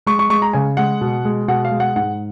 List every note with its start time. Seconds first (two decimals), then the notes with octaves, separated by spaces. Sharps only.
0.07 G#3 C#6
0.19 C#6
0.30 G#3 C#6
0.42 A#5
0.53 C#3 G#5
0.77 G#3 F#5
1.01 B2
1.25 G#3
1.48 B2 F#5
1.65 F5
1.71 G#3
1.80 F#5
1.96 G#2 F#5